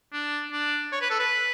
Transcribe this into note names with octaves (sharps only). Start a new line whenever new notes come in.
D4
D4
C#5
B4
A4
B4